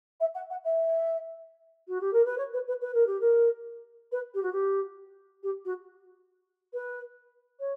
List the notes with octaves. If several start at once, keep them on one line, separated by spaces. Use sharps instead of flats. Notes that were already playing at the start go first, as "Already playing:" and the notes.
E5
F#5
F#5
E5
F#4
G4
A#4
B4
C#5
B4
B4
B4
A#4
G4
A#4
B4
G4
F#4
G4
G4
F#4
B4
C#5